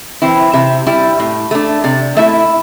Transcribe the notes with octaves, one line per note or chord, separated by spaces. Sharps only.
E3 C4 E4
C3 E5
G3 E4
A2
A3 D4
C3 D5
A3 E4 E5